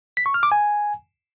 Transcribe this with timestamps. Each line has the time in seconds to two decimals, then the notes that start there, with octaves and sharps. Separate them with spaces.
0.17 B6
0.26 C#6
0.34 F6
0.43 D6
0.52 G#5